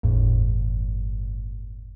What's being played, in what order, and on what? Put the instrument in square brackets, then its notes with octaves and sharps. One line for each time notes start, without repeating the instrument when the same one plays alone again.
[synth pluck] G1 E2 A2